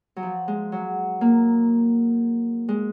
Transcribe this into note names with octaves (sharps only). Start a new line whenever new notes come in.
F#3
F3
G#3
F#3
A#3
G#3